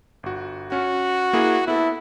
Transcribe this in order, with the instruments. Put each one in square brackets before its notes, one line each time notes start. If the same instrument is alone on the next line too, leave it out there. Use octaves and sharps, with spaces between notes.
[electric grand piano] G1 F#4
[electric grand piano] C#4 [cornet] F#4
[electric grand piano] A#3 E4 G#4
[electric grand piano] B3 A4 [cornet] E4